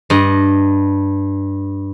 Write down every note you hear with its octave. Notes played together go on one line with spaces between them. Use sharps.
G2 D#5